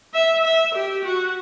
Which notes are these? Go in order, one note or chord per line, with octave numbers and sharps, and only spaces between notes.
E5
E5
G4
F#4